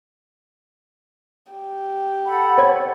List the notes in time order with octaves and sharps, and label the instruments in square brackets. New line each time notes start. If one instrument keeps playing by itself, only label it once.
[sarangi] G4
[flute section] A4 F#5 B5
[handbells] C5 C#5 G#6